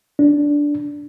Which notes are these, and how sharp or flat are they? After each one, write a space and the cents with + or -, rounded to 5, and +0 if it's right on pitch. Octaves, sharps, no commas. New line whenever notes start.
D4 -10